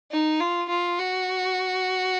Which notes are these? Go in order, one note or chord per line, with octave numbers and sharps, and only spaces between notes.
D#4
F4
F4
F#4